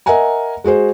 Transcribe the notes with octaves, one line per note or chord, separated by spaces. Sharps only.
A#4 D#5 E5 F#5 G#5 A#5
G#3 F#4 G#4 C5